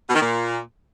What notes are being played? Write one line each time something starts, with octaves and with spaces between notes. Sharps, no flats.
B2
D#3
A#2